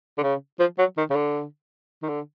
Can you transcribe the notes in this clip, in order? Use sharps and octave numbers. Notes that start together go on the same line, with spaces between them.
D3
C#3
F3
F#3
D#3
C#3
D3
D#3
D3